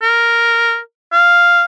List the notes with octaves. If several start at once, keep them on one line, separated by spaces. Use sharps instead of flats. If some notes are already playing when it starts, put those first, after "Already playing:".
A#4
F5